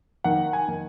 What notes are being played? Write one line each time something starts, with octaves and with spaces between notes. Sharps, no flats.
D#3 F#5
G#5
D#3